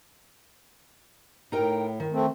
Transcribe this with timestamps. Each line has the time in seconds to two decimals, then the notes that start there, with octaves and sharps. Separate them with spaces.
1.52 A2 D#4 A#4 G5
2.00 D#3
2.12 A3 C4